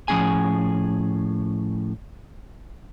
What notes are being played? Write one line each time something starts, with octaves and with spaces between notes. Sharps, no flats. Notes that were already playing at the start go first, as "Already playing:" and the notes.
A2 F3 A#3 C#4 G#4 G#5